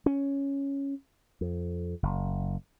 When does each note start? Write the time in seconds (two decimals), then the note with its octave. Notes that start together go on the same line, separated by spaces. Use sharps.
0.06 C#4
1.41 F2
2.03 F#1